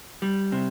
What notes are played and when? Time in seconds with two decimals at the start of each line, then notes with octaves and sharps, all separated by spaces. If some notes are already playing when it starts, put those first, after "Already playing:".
0.22 G3
0.52 C3